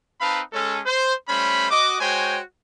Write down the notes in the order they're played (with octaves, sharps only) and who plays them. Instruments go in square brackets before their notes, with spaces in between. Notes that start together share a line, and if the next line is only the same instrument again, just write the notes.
[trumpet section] C4 D#4 B4 F5 A5 B5
G#3 C#4 A4
C5
G3 A3 C#4 C5 B5
F#4 D#5 D6
G#3 F#4 C5 C#5 G5 G#5